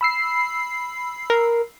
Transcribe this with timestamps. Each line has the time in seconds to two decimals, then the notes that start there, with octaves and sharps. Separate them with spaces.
0.01 B5 E6 C7
1.30 A#4